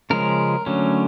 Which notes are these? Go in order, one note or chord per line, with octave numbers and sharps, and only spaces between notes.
C#3 F3 G#3 C#4 A#4
D3 F#3 A3 C#4